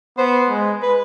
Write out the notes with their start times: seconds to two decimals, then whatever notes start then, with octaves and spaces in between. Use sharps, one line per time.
0.18 B3 C5
0.50 G#3
0.83 B4